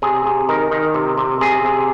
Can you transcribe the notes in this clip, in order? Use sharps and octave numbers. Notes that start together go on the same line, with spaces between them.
C3 G#4
C3
D#3 A#4
D#3
C3
C3
C3 G#4
C3